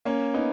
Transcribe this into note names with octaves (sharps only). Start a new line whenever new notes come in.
A#3 C#4
B3 D#4